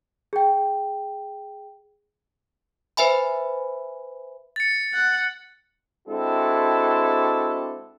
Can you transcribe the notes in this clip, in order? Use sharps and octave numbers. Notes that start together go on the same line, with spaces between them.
G#4 G5
B4 C5 E5 G#5 B5
A6 C#7
F#5
G#3 C4 D4 E4 F#4 A4